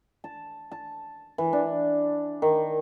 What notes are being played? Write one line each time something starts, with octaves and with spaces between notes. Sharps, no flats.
A5
A5
E3
D4
D#3